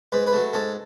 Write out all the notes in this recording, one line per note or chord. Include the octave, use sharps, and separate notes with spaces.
G#2 B4
B4
F#3 A3
G#2 A4